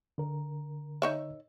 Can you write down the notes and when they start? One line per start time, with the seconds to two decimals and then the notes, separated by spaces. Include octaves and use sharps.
0.18 D3 A#4
1.02 D#4 C#5 E5